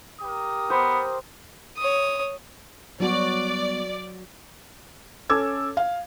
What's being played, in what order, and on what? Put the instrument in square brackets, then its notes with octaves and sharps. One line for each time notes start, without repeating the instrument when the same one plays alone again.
[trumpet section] G4 A#4 D#6
[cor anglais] B3 [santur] C5
[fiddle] C#5 D#6
[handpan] F#3 F#4 [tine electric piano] G3 B3 [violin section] D5
[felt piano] C#4 A4 D6 E6 G#6
F5